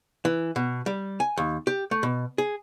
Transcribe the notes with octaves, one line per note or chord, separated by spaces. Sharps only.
E3
B2
G3
G#5
D#2
G4
A3
B2
G#4